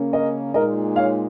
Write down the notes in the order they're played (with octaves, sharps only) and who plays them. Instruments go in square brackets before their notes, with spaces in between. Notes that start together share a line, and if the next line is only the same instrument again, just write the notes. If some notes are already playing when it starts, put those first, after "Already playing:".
Already playing: [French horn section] C#3 A#3 C#4
[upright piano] A#4 D#5
[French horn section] A#2 G#3 D#4 [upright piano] A#4 D#5
[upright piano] C#5 F5